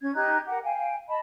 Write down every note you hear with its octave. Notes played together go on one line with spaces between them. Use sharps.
C#4 G#6
D#4 G4 F#6 G#6
G4 A#4 F#5
F5 G5 G#5
D#5 A5 B5